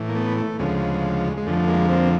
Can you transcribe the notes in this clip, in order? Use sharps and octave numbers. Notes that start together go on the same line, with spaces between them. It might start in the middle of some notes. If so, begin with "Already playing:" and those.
Already playing: A2 E3
A#3
A3 B3
A3
D2 C#3 F3 G#3
G#3
F2 D3 F3 A3
G#3 A#3
A#3 C4